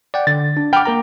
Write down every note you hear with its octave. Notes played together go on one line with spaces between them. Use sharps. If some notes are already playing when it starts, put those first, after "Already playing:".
D5 F#5 G5
D3 A6
D4
F#5 G5 B5 D6 F6
A#3 A#4 A#5